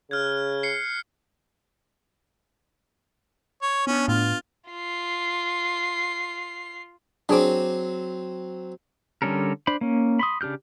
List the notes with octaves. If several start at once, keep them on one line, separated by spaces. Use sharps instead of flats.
C#3 F6 F#6 G#6
C7 C#7
C#5
B3 C#4 D4
A2 F4
F4 C7
F#3 C4 D4 G#4 D6
D3 G3 C#4 A4 A#4
D4 C5 B5
A#3 C#4
B5 C6 D#6
C#3 D4 G4 F6 G6